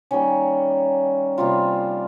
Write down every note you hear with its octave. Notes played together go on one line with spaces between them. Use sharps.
D#3 G3 A#3 C#4
C3 G3 A#3 F4